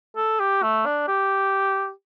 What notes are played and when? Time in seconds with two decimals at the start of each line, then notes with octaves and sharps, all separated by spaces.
0.16 A4
0.40 G4
0.62 A3
0.86 D4
1.08 G4